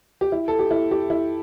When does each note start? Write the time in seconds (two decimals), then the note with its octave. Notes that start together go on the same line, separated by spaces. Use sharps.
0.21 G4
0.32 E4
0.48 A4
0.59 G4
0.71 E4
0.91 G4
1.10 E4